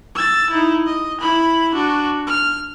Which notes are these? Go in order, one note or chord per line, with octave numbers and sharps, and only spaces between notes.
E6 A6
D#4 E4
D#5
E4 B5
D4 F#4
F6